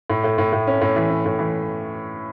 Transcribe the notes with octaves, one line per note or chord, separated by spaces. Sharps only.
A2
A2
A2
A2
C#4
A2
E3
C#4
A2
E3